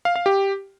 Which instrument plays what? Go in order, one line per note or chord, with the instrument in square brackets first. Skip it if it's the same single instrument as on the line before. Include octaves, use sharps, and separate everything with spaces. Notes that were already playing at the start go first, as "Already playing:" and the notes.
[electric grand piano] F5
F5
G4